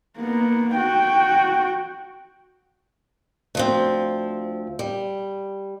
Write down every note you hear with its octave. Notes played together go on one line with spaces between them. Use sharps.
A#3 B3
F#4 G5
D2 F3 C4
G3